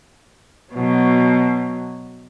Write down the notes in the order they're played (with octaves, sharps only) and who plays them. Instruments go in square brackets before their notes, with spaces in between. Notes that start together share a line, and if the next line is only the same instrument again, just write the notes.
[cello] B2 F#3